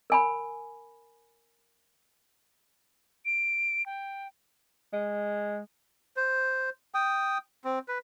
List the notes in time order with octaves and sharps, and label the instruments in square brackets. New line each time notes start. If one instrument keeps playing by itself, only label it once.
[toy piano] A#4 G#5 B5
[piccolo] D7
G5
[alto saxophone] G#3
[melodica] C5
G5 D#6
C4
B4